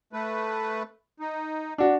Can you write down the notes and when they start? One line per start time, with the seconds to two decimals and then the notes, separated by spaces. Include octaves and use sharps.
0.13 A3 B4
1.20 D#4
1.78 D4 F#4